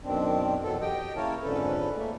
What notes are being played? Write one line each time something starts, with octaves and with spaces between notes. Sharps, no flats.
F#2 B2 D#3 C4 D4
E2 B2 F#3 B3 A4
G4 D#5 G5
C#3 A#3 E4 A#4 C#5 A5
F2 G#2 D3 C#4 A4 B4
A3 A#3